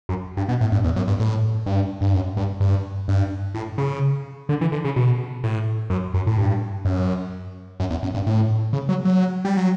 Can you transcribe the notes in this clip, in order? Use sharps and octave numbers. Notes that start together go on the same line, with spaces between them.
F#2
G2
B2
A2
G2
E2
F#2
G2
A2
G2
G2
F#2
G2
G2
G2
A2
C#3
D3
E3
D3
C#3
B2
A2
F#2
F#2
A2
G2
F#2
F#2
E2
F#2
G2
A2
C#3
F#3
F#3
G3
F#3